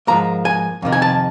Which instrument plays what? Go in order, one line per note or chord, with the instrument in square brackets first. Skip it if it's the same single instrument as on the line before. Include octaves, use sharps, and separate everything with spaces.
[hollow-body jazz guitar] G#2 F3 A#3 A#5
G#5
F2 C3 D#3
G#5
A5